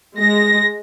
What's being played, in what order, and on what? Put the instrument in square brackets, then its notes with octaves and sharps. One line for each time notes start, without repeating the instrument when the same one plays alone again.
[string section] G#3 A#6